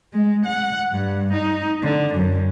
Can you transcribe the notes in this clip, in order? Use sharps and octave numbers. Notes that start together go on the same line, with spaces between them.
G#3
F#5
G2
D#4
D3
F#2